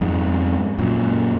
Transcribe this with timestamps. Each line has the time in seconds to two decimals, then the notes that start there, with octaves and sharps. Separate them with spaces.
0.01 F2 G#2
0.78 F#2 A#2